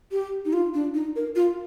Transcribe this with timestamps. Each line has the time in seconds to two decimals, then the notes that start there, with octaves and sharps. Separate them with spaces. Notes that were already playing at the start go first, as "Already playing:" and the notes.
0.12 G4
0.45 D#4
0.53 F4
0.74 D4
0.94 D#4
1.16 A#4
1.36 F4